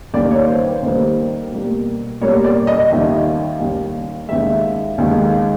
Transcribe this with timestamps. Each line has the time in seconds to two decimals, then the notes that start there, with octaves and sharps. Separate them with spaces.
0.14 D#2 D#3 G3 A#3 D5
0.31 C#5
0.48 C5
0.66 B4
0.83 D#2 D#3 G3 A#3 C5
1.52 B2 G3 A#3
2.21 B2 G3 A#3 C#5
2.44 D5
2.67 D#5
2.90 D#2 D#3 G3 E5
3.59 D#2 D#3 G3 F5
4.28 D#2 D#3 G#3 E5
4.98 D#2 D#3 G#3